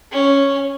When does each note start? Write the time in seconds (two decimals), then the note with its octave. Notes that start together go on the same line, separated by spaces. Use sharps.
0.12 C#4